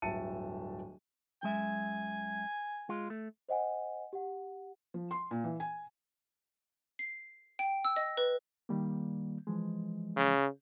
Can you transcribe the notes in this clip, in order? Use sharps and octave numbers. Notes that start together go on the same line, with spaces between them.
D1 G1 E5 A5 C#7 D#7
F#2 G#3 E5 G#5
G#3 F4
A3
C5 D#5 F#5 G#5
G4 F#5
F3
C6
A#2
E3
G#5
C7
G5
E6
D#5
B4
D#3 G3 A#3
E3 F3 G#3
C#3